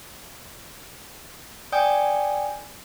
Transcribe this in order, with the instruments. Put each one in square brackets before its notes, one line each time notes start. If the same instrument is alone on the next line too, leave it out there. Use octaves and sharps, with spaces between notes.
[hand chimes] D5 G5 G#5 D#6 G6